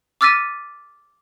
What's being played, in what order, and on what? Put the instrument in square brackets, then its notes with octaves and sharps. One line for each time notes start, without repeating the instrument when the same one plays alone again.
[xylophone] D6 E6 F6 A6 B6 D#7